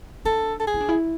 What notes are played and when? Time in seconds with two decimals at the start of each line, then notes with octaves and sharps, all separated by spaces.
0.25 D4 A4
0.60 A4
0.67 G#4
0.74 E4
0.81 D4
0.89 E4